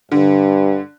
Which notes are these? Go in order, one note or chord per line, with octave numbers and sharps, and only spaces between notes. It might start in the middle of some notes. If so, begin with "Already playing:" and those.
G2 D3